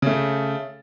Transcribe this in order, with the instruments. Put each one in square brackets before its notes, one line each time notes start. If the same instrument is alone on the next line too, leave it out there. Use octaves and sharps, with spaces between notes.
[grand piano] C#3 A3